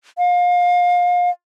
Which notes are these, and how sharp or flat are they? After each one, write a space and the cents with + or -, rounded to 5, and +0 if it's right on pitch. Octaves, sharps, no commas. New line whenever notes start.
F5 +30